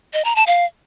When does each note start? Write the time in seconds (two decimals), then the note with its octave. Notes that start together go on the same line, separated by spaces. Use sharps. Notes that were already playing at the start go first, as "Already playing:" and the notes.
0.13 D#5
0.25 A#5
0.36 A5
0.47 F5